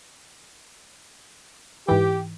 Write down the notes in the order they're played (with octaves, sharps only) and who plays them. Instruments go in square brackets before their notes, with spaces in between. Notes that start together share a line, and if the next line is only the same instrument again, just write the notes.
[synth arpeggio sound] G#2 E3 [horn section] G4